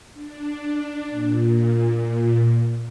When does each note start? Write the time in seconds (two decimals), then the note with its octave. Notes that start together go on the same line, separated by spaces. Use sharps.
0.14 D4
1.11 A#2